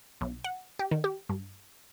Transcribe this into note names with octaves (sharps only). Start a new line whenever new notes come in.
B1
F#5
G4
D#3
G4
G2